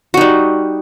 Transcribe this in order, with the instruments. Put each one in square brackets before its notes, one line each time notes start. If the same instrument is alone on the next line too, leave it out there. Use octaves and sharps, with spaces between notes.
[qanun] F#4
D#4
G3